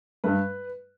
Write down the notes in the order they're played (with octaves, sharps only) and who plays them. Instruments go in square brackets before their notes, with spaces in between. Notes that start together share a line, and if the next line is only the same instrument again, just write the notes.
[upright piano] G2 B4